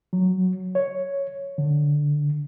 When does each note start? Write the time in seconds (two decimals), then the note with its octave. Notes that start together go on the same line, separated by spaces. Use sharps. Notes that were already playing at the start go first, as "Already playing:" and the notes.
0.13 F#3
0.75 C#5
1.58 D3